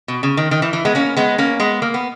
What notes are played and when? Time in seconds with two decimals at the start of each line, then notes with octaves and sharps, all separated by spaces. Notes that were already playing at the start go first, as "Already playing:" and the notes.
0.08 B2
0.23 C#3
0.37 D#3
0.51 D#3
0.62 E3
0.73 E3
0.85 G#3 B3
0.95 A#3 C#4
1.17 G#3 B3
1.38 A#3 C#4
1.60 G#3 B3
1.82 A#3
1.94 B3